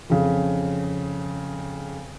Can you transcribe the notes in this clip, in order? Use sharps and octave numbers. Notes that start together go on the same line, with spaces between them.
F2 C#3